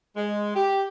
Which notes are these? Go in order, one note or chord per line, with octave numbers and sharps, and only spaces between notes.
G#3
G4